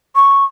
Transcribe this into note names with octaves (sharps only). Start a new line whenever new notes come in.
C#6